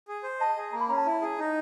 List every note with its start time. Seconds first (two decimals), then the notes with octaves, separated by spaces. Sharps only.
0.08 G#4
0.23 C5
0.40 D#5 A5
0.56 G#4
0.73 A#3 A#5
0.81 B5
0.88 C#4 A#5
0.97 A5
1.06 E4
1.21 G#4
1.38 D#4